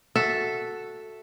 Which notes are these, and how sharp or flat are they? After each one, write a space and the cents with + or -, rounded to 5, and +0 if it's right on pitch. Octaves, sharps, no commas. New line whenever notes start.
F#4 -5 A4 +0 E5 +0